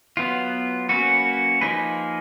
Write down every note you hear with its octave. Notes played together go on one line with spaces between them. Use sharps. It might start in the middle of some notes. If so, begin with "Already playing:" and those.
F#3 B3 F4
F#3 A#3 C#4 F#4 B4
F3 A#3 D#4 G#4 B4